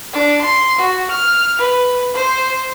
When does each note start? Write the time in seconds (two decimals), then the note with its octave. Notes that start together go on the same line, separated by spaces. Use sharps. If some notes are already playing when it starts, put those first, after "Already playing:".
0.13 D4
0.42 C6
0.78 F#4
1.11 F6
1.59 B4
2.14 C5